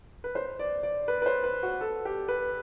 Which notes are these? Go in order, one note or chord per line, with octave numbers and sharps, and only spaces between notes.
B4
C5
D5
D5
B4
B4
C5
B4
F#4
A4
G4
B4